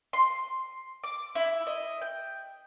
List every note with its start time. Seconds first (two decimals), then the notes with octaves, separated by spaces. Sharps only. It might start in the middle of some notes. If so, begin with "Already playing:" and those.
0.13 C6
1.04 D6
1.35 E4
1.67 D#5
2.01 G5